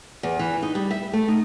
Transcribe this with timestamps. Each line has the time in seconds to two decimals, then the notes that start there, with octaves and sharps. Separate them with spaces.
0.23 E2
0.39 E3
0.62 D#4
0.75 G3
0.91 E5
1.13 A3
1.28 D#4